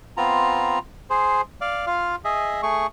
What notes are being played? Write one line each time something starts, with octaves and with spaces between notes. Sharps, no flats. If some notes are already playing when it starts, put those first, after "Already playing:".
B3 C4 F4 A#5
G#4 C5
D5 F5
F4 F5
G#4 D#5 E5
A3 G#4 C#6